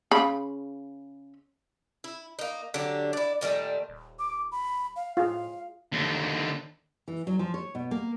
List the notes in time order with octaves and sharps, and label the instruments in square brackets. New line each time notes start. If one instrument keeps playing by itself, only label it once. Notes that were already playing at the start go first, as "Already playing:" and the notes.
[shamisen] C#3 B5
[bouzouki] E4
A#3 D#4
D3 F#3 D4 G4
E4 D5
A#2 D#3 G3 A3
[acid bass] D#1
[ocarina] D6
B5
F5
[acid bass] A2 [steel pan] F4 G#4 [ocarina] F5
[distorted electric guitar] D#2 D3
[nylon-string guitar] E3
F#3
F3
C#5
B2
A#3